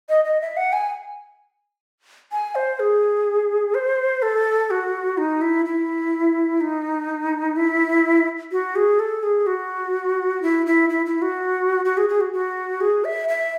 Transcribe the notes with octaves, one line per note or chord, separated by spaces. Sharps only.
D#5
D#5
E5
F#5
G#5
G#5
C5
G#4
C5
A4
F#4
D#4
E4
E4
D#4
E4
F#4
G#4
A4
G#4
F#4
E4
E4
E4
E4
F#4
F#4
G#4
G#4
F#4
F#4
G#4
E5
E5